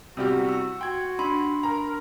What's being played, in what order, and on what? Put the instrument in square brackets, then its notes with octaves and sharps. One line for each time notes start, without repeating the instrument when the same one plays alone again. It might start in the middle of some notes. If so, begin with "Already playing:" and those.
[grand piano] C3 G3 G4 [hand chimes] B3 E4 E6 [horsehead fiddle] F#4
[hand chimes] E6
[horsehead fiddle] F#4 [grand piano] G5 [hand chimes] C6 G#6
[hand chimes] D4 B5 C6
[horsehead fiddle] A#4 [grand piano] A#5